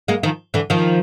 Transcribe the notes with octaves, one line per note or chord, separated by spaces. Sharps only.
G#3 A#3
D#3 F3
D3 E3
D#3 F3